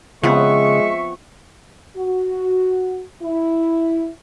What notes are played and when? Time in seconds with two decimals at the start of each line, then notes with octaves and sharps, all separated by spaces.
0.23 C#3 F3 G#3 B3 C4 E5 C#6
1.95 F#4
3.22 E4